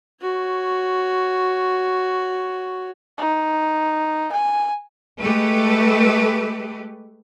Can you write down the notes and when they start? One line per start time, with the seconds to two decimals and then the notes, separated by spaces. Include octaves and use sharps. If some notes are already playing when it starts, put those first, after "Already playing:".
0.21 F#4 C#5
3.18 D#4
4.32 G#5
5.20 G#3 A3 G4 A4 B4